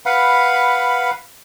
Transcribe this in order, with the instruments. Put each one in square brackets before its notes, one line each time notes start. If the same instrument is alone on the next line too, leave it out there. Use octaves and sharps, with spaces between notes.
[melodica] B4 F5 F#5 B5